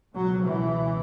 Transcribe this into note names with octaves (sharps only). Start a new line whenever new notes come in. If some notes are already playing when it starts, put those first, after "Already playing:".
C#2 B2 F#3
E3